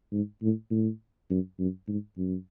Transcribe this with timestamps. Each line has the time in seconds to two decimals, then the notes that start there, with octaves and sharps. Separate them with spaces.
0.12 G#2
0.43 A2
0.71 A2
1.30 F#2
1.59 F#2
1.88 G#2
2.17 F#2